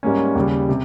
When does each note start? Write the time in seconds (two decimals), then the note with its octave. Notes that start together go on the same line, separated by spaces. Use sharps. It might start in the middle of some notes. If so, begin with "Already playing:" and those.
0.03 G#2 G3 A#3 C#4
0.35 D#2 C#3 G3
0.69 C3